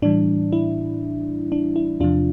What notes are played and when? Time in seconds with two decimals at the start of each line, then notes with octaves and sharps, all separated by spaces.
0.02 A2 E3 G3 D4
0.53 E4
1.52 D4
1.76 E4
2.00 E2 C3 F3 D4 F4